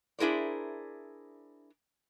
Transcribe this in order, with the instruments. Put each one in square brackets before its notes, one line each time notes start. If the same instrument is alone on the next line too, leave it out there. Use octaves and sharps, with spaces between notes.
[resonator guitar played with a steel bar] D4 E4 G#4 A#4 C5 D5